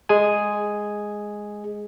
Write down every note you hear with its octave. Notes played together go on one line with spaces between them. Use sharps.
G#3 G#4 G#5